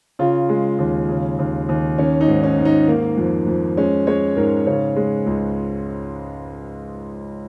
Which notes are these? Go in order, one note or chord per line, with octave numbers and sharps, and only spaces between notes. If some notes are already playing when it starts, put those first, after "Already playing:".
C#3 F4
G#3
D#2
C#3
D#2
D#2
D#3 C#4
D#4
G#2
C#4
G#2
D#4
D#3 A#3
F2
F2
G#3 C#4
G#3 C#5
G#2 A#4
C#3 C#5
G#3
C#2